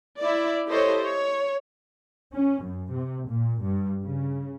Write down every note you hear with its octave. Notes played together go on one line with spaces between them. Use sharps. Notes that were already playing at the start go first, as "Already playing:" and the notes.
E4 D5
E4 G4 A4 C5 C#5 D#5
C#5
C#4
F#2
C3
A#2
G2
C#3